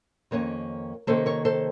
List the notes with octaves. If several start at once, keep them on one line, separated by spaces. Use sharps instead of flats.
F2 D#3 A#3 C#4 A#4 C#5
C3 D#3 A#3 C#4 A4 C5
A#4 C#5
A4 C5